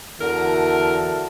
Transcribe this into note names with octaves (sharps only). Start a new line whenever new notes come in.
E2 D3 F#4 A#4 E5 A5